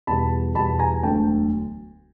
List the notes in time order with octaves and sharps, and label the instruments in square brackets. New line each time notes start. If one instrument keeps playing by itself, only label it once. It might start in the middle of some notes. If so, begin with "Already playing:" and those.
[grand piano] E2 B2 G3 A5 B5
E2 B2 G3 A5 B5
G#5 A#5
E1 D2 D3 F#3 A3 G5 A5